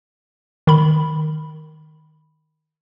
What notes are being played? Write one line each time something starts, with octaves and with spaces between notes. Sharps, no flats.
D#3 B5